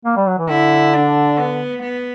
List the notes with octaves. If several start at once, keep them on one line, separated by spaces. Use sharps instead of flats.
A#3
G3
F#3
E3
D3 E4
D4
B3
B3